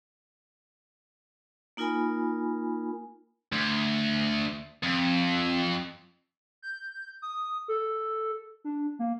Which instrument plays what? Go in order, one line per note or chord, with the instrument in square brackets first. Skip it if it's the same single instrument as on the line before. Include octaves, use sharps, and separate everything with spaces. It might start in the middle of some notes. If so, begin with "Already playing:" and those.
[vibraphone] A#3 D#4 F4 A#4 G#5 B5
[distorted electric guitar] D2
F2
[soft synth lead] G6
D#6
A4
D4
A#3